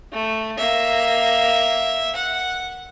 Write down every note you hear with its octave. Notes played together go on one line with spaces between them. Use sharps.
A3
A#3 E5
F#5